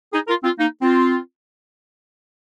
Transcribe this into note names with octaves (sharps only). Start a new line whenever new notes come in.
D#4 G#4
F4 A#4
C4 F4
A#3 D#4
C4 F4